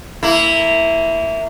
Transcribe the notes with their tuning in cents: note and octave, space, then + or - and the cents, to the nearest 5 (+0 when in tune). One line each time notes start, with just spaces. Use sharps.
A#3 -25 E4 +0